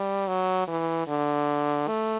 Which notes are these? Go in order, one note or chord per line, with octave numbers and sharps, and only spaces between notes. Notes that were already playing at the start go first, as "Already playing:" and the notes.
Already playing: G3
F#3
E3
D3
A3